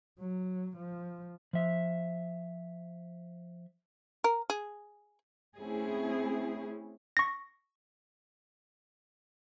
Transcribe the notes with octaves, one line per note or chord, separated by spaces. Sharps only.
F#3
F3
F3 E5
A#4
G#4
A3 C4 C#4 E4 G#4
C#6 A#6